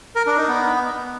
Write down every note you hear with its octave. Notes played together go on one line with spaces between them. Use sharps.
A#4
D4
D#4
B3